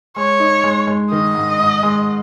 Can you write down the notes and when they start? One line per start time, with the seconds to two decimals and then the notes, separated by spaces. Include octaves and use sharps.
0.16 G#3 C#5
0.40 D#4
0.64 G#3
0.87 G#3
1.11 D#3 D#5
1.35 G#2
1.59 G#2
1.83 G#3